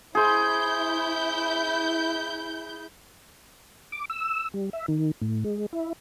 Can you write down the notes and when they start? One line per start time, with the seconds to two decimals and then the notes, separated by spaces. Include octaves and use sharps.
0.15 E4 G#4 C5 G6
3.92 D6
4.10 E6
4.54 G3
4.73 E5
4.88 D#3
5.22 A2
5.44 G#3
5.73 E4